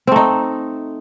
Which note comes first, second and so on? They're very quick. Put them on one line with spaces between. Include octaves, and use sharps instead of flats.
C4 A3 D#4